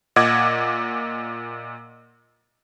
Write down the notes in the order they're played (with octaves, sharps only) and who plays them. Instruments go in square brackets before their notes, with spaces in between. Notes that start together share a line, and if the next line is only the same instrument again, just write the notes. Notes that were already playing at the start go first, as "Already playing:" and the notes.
[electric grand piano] A#2 D#5 F#5 D6 G#6